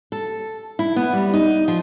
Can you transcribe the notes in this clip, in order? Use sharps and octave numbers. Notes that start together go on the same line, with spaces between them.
A4
E4
B3
G3
D#4
F3